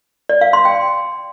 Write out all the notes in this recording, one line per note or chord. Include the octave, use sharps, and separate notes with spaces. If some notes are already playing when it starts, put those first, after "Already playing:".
D5
F5
C6
G5